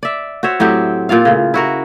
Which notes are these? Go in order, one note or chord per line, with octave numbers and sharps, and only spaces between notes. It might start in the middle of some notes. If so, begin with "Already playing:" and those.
D5 E5
F#4 C5 C#5 E5
A2 F#3 C4 G4
A#2 F4 D5 F5
A2 C#3
E4 F#4 A#4